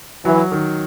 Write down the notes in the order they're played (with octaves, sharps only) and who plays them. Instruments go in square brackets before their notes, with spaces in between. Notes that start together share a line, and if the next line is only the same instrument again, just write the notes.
[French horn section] E3 [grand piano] F#3
[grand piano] D#3